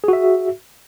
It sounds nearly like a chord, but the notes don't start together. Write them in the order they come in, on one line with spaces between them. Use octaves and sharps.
G#4 F#4 E5